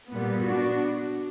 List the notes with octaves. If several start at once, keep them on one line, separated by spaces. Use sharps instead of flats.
A#2 G3 B3
B3 D4 F#4